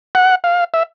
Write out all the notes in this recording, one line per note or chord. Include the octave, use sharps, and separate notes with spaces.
F#5
F5
E5